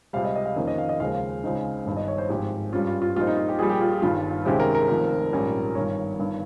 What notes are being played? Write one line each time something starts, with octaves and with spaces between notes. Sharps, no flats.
C#2 C3 G3 F5
D#5
D#5
F5
F2 D#3 A#3 C#4 D#5
D#5
F5
D#5
D#2 C#3 F3 G#3 F5
C#2 C#3 G#3 C4 D#4
G1 G2 D#3 G3
D#5
C#5
C5
G#1 G#2 F3 G4
G2 G3 C#4 F4
F4
F4
A#1 A#2 G3 C4 D#4 F4
D#4
F4
G4
A#1 A#2 G3 G#4
G4
F4
F4
G1 G2 D#3 G3 F4
C#2 C3 D#3 G#3 C#4 G4
A#4
A#4
F1 F2 D#3
A#1 G#2 G3 C#4
G1 G2 D#3 C#5
G1 G2 D#3